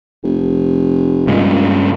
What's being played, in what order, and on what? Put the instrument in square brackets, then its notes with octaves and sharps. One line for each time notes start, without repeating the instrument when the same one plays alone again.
[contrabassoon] F1
[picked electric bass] G2 C#3 G#3 [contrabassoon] A#2